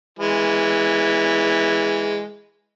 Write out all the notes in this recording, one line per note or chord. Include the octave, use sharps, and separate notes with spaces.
E3 G#3